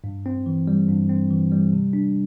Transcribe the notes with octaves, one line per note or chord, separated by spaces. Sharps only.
G2
C4
E3
G3
G2
C4
E3
G3
C3
D4